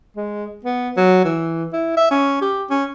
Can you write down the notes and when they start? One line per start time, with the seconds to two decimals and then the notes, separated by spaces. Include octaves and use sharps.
0.17 G#3
0.65 B3
0.97 F#3
1.25 E3
1.73 E4
1.97 E5
2.11 C#4
2.42 G4
2.70 C#4